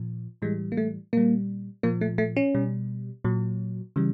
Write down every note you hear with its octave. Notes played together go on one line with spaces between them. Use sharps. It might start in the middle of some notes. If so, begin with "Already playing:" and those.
Already playing: A#2 F3
A2 E3 G3 G#3
A#3
A3
A#2 G3 A#3
A#2 F3 A#3
A3
A3
C#4
B2 G3
A#2 F#3
C#3 E3 G3